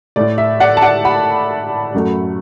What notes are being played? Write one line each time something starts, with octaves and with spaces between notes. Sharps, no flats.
A2 A3 D5
E5
D5 F#5
A5
D5 F#5
F#5 B5
F#2 F#3 A3